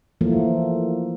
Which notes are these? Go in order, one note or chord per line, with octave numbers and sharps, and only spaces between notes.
E3 F3 A3 A#3